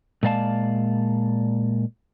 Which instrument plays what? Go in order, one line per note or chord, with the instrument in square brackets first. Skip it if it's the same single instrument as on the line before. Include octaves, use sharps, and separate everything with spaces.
[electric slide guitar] A#2 G#3 D5 F5 A5